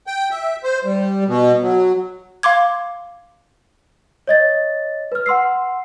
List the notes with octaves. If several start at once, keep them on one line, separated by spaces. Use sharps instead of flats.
G5
E5
C5
G3
B2
F#3
F5 C6 D6 G#6
C#5 D#5 A6
B4 F6
F#5 C6 E6 C7